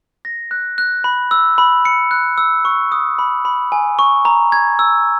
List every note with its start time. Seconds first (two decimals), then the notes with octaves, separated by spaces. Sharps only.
0.25 A#6
0.51 F#6
0.78 F#6
1.04 B5
1.31 E6
1.58 B5
1.85 C#7
2.11 F#6
2.38 E6
2.65 C#6
2.92 D#6
3.19 B5
3.45 B5
3.72 G#5
3.99 C#6
4.25 A#5
4.52 G#6
4.79 E6